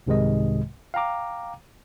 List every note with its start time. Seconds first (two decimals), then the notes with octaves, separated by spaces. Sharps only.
0.07 C2 G#2 C3 D#3 G#3 D#5
0.94 F5 G5 A#5 D6